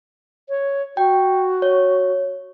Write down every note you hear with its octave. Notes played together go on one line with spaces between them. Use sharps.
C#5
F#4 G5
C#5